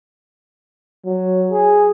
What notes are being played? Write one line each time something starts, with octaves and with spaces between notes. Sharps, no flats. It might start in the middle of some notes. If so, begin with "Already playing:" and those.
F#3
G#4